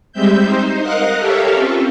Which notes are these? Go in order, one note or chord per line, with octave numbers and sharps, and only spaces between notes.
G3 G#3 C4 E5 G6
D#4 C5
A#4 D#5 F5 F#5 F#6
G4 A4 A#4 C#5 E5 F5
C4 C#4 F4